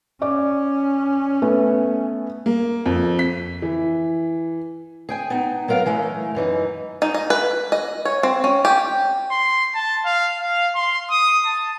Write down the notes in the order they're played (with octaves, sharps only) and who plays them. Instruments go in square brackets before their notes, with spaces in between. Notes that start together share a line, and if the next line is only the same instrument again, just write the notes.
[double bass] C#4 [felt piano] D5 D6
[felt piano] A3 B3
[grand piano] A#3
F2
B6
E3
[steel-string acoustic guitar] G#4 G5 G#5
B3 D#4
F#3 B3 A#4 F5
E3 G#3 A3
F#2 E3 D#4
[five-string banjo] D#4
D#5
B4
D#5
C#5
C4
C#4
G4
[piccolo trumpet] C6
A5
F5
F5
C6
D#6
A5